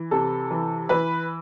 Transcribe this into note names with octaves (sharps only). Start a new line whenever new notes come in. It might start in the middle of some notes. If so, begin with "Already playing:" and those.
Already playing: E3
C3 A4
E3
E3 B4